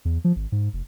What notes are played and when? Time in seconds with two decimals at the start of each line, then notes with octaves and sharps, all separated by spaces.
0.05 E2
0.24 F3
0.36 G#1
0.52 G#2
0.73 F1